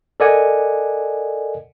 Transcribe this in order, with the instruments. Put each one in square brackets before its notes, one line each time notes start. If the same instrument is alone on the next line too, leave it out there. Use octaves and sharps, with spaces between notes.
[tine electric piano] A4 A#4 D5 D#5 F#5 G#5